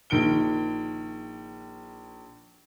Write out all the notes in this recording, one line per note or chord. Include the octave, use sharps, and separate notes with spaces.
A#1 D#3 D7 G7